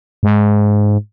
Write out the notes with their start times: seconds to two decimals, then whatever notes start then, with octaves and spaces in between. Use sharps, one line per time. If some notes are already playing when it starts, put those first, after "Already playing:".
0.23 G#2